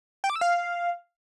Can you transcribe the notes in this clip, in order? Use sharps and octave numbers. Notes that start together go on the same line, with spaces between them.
G5
D6
E6
F5